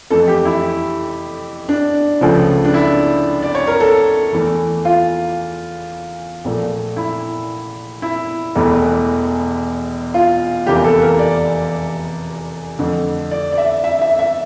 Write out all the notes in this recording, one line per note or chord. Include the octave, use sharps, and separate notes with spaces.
F2 E3 A3 A4
G4
E4
D4
C#2 C#3 F3 A3
D4
E4
D5
C#5
A#4
A4
E2 E3 A3
F4
A#1 A#2 A3
E4
E4
E1 E2 E3 A3
F4
F1 E2 E3 A#3 G4
A4
A#4
D5
F2 D3 A3
D5
D5
E5
E5
E5
E5